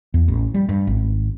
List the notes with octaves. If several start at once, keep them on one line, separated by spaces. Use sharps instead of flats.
E2
A1
G3
G2
G#1